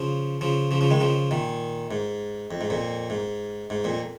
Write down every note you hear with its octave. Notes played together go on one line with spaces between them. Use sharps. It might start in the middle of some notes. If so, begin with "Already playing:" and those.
Already playing: C#3 F3
C#3 F3
C#3 F3
C#3 F3
D#3 G#3
C#3 F3
A#2 D#3
G#2
F2
G#2
F2 A#2
G#2
G#2
F2 A#2